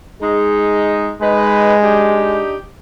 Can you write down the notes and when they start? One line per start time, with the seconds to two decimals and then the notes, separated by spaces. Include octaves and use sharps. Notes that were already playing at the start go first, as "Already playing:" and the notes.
0.20 G#3 D#4
1.21 G#3 D#4 B4
1.82 D4 D#4 G4